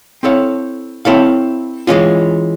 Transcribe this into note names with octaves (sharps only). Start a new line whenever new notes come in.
C4 E4 A4 C#5 F5
C4 E4 A4 C#5 F5
E3 G#3 C#4 F4